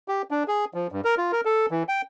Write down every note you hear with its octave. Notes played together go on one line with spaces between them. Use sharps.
G4
D4
G#4
F3
G2
A#4
F4
A#4
A4
E3
G5